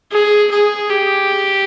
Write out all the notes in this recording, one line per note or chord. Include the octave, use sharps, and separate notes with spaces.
G#4
G#4
G4